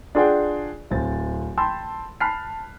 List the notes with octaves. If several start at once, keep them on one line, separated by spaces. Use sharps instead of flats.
D4 F4 G#4 D5 F#5 G5
D1 C4 A6
G5 A5 B5 C6 E6
A5 B5 F6 F#6 B6 C7